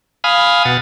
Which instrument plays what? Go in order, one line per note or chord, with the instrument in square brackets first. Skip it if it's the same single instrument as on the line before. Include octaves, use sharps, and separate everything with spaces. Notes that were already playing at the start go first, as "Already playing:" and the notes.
[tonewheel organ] F5 G#5 B5 D#6 F6
B2 F#5 A6